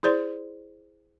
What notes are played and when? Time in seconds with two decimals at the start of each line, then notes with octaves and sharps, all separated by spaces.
0.03 E4 G#4 C5 D5 C6